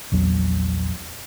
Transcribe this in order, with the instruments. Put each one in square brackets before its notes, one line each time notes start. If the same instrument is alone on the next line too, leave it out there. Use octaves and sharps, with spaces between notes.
[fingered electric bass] A#1 E2 F#3